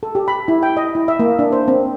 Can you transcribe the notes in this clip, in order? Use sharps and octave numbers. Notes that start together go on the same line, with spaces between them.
A4
G4
B5
E4
G5
D#5
E4
E5
A#3
D4
C5
C4